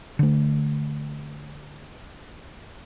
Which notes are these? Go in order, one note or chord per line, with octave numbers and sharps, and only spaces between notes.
D3 A3